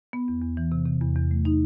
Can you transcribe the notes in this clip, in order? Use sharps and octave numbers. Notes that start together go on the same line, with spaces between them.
B3
E2
E2
E3
C3
C3
E2
E2
A3
D#4